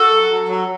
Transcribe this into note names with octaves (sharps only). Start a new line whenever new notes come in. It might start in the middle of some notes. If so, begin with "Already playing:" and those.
Already playing: F#4 A4
F#3
F#3
F#3